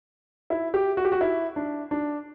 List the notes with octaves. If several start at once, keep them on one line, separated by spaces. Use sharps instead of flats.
E4
G4
F#4
G4
F#4
E4
D4
D4